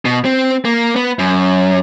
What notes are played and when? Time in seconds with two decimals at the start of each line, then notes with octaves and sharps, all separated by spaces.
0.05 B2
0.25 C4
0.65 A#3
0.96 B3
1.19 F#2